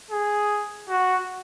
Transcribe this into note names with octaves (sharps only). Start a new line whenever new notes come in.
G#4
F#4